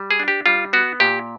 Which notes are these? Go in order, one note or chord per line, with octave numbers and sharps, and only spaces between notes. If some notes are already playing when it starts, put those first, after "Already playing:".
Already playing: G3
G#4
D4
G4
G3 F4
B3 F#4
A#2 G4